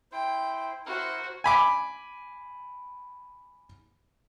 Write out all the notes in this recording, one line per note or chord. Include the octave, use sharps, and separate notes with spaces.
E4 C5 G5
E4 F#4 A#4 C5
G#5 B5 D6